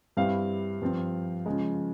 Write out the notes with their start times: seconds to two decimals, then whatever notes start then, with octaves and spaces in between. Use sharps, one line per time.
0.17 G2 G3 C4 E4 F5
0.82 G2 F3 C4 F4
1.46 C#3 F3 G#3